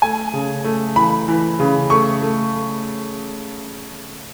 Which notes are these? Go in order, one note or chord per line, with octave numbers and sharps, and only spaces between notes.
A3 G#5
C#3
A3
E3 B5
E3
C#3
A3 C#6
A3